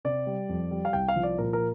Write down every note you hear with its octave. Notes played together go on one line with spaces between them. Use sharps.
C3 D5
G3
F2
G3
F5
C2 G5
F5
F3
D5
A#2 A#4
A#4